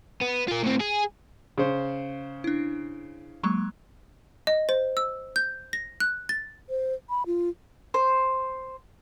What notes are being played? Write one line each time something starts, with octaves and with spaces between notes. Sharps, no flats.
B3
F4 A#4
A2 C4
G#4
C#3 C5
D4 E4
F#3 G#3 A#3 C#6
D#5
C5
E6
G6
A#6
F#6
A6
C5
B5
F4
C5